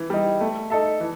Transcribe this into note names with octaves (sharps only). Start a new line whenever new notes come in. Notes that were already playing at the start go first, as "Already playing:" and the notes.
Already playing: E3
G3 D#4
A3
D#4 A4 E5
E3